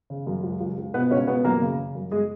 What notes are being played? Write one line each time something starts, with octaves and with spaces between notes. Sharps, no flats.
C#3
F#2
C#2
C#2
C#2
B2 B3 B4
C#2 C#4 C#5
B2 B3 B4
F#2 A#3 A#4
C#3
C#3
F#2
G#3 G#4